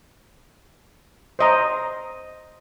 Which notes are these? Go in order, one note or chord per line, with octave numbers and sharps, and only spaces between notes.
C5 D#5 A#5